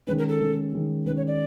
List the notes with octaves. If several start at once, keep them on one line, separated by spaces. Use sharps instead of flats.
D#3 G#3 C#4 B4
A#4
A4
D#3 G#3 C#4
D#3 G#3 C#4
D#3 G#3 C#4 B4
C#5
D5